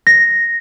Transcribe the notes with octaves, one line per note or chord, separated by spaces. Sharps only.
A#6